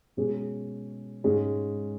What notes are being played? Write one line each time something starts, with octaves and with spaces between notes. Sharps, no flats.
B2 G#3 C#4 G#4
G#2 G#3 C#4